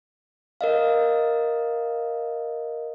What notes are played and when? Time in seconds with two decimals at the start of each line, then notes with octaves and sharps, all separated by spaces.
0.61 A#4 D#5 F5